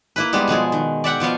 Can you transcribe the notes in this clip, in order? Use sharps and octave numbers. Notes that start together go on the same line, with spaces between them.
A#3 E4 B4
G3 G#3 B3
B2 F3 G#3 G#4
D#3
D5 E5 F#5 G5
B2 F3 B3 F5